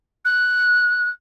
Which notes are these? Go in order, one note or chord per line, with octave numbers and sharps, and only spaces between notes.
F#6